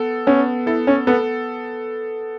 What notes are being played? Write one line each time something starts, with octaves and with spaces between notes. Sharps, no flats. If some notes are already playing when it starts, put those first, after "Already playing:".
Already playing: B3 A4
B3 C#4
E4 A4
C#4
B3 A4